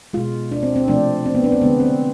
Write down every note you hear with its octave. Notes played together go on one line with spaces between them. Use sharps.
B2 G#3 F4
D4
C4
C4
C3 F3 A3 D4
C4
B3
D4
C4
D3 G#3 B3
C4